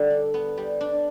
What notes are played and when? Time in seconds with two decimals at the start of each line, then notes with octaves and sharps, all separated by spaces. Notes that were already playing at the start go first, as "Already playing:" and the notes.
Already playing: D3 G3
0.10 D4
0.34 B3
0.58 G3
0.81 D4